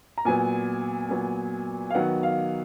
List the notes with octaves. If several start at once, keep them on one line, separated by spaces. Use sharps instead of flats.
A#5
A#2 F#3 B3 G#5
A#2 F#3 B3
F5
D#3 F#3 B3 F#5
F5